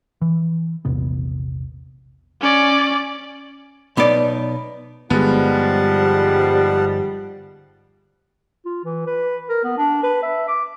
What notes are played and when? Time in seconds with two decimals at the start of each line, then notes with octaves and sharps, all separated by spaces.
0.22 E3
0.85 A#1 E2 C3 B3
2.41 C#4 D5
3.97 B1 B3 D#4 D5
5.10 G1 G#2 F3 G3 G#3 B3 F#5 A5
8.65 F4
8.84 E3
9.07 B4
9.49 A#4
9.64 B3
9.78 D4
10.03 B4
10.22 E5
10.48 D6